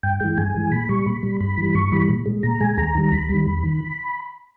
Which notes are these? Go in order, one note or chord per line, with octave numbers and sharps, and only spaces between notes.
G2 G5
E3 G#3 G5
G2 G#5
E3 G#3
A#2 B5
G3 C#6
A#2 B5
G3
G2 B5
E3 G3
G2 C#6
E3 G3 B5
A#2
G#3
A#2 A#5
G#3 G#5
D#2 A#5
D#3 G3
D#2 B5
D#3 G3
E2
D#3